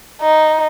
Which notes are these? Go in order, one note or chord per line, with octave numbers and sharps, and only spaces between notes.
D#4